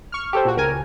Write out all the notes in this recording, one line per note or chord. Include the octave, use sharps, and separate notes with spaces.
C#6 F6
G4 A4 C5
A#2 F#4
C#2 A#4 G#5